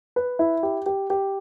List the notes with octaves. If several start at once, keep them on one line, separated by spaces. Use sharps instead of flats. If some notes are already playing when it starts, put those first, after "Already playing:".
B4
E4
G4
G4
G4